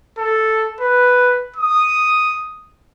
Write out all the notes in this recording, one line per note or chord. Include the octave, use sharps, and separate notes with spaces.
A4
B4
D#6